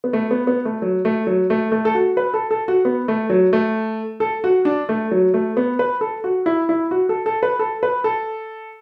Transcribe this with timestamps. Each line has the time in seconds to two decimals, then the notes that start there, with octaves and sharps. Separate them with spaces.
0.04 B3
0.13 A3
0.31 B3
0.47 B3
0.65 A3
0.82 F#3
1.05 A3
1.27 F#3
1.50 A3
1.72 A3
1.85 A4
1.95 F#4
2.17 B4
2.34 A4
2.51 A4
2.68 F#4
2.85 B3
3.08 A3
3.30 F#3
3.53 A3
4.20 A4
4.44 F#4
4.65 D4
4.89 A3
5.11 F#3
5.34 A3
5.57 B3
5.79 B4
6.01 A4
6.24 F#4
6.46 E4
6.69 E4
6.91 F#4
7.09 A4
7.26 A4
7.43 B4
7.59 A4
7.83 B4
8.04 A4